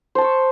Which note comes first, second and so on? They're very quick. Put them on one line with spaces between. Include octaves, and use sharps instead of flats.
C5 A5 E6 C#6